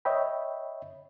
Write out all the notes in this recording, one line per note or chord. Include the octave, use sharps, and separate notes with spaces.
C#5 D#5 E5 G5 B5